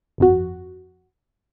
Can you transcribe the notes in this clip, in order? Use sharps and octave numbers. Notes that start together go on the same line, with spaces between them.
G1 F2 F#4